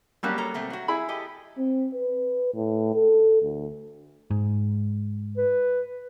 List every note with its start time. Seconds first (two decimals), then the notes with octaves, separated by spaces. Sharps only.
0.23 F#3 G3 A#3 C#4 F#4 A5
0.38 A4 C#5 A#5
0.54 B2 A3 C4
0.70 F#3 F#4
0.88 E4 G#4 B5
1.09 G4 A4 D#5
1.58 C4
1.94 B4
2.54 A2
2.95 A4
3.42 D2
4.31 G#2
5.37 B4